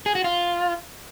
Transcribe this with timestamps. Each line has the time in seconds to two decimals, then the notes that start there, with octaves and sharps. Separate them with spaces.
0.06 G#4
0.15 F#4
0.24 F4